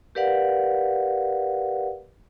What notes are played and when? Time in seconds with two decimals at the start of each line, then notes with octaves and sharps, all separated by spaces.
0.15 G4 A#4 B4 D5 F5 F#5